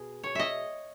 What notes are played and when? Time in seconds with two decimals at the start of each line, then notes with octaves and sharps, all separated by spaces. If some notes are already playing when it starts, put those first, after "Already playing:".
Already playing: B2 G#4
0.23 C#5
0.35 D#5 E5